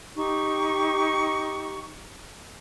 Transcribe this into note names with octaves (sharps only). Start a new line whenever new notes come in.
D#4 G4 C#6